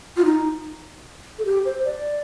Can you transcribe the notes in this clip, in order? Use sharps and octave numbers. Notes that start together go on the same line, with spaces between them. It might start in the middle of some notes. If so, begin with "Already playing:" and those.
F4
D#4
A4
G4
C5
D5